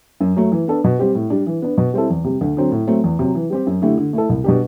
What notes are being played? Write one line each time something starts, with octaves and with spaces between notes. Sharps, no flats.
F#2
F#3 A3
E3
B3 D4 A4
B2
G3 C4 G4
A2
G3 D4
E3
B3 D4
B2
G3 C4 E4 A4
E2
C3 G3
D2
D3 F#3 C4
A2
F#3 A3 C4
E2
C3 F#3
E3
G3 C4 G4
F#2
D3 A3 E4 G4
D3
A3 E4 A4
C2
B2 G3 D4 G4